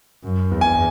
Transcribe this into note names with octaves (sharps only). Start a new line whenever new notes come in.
F#2
E2
G#5